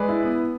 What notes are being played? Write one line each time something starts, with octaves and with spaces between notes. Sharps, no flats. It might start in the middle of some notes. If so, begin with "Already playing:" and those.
Already playing: G#3 B4 D5
E4
B3